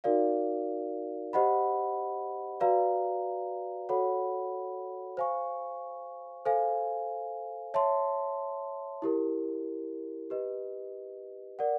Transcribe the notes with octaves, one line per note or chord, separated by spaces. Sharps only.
D#4 F#4 A#4 D5 F5
G4 C5 D#5 F#5 B5
F#4 B4 D5 F5 A#5
F#4 A4 C#5 F#5 B5
C5 F5 G#5 C#6
A4 C5 F5 G#5
C#5 E5 A5 C6
E4 G4 A#4
G4 B4 D#5
A#4 D5 F#5